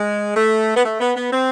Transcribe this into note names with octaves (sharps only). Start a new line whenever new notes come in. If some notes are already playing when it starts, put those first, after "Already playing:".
Already playing: G#3
A3
B3
A3
B3
B3
C4